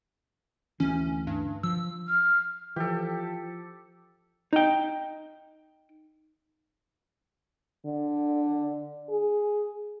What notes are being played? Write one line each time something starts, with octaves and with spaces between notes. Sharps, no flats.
D2 E3 C#4
G2
F3 E6
F6
E3 F3 G4 A4
D#4 G5
D3
G#4